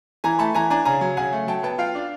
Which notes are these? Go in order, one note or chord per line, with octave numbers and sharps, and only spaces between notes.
E3 G#5 A#5
A3 A5 B5
E3 G#5 A#5
D4 G#5 A#5
C#3 G#5 A#5
F#3
C#3 F#5 G#5
A3
F#3 G5 A5
B3 G5 A5
F4 F5 G5
D4